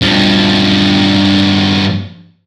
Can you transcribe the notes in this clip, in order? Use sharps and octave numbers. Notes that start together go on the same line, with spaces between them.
G2 F3